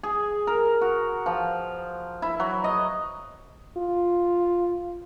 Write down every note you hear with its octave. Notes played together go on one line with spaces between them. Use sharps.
G#4
A#4
F#4
F3
E4
F#3
D#5
F4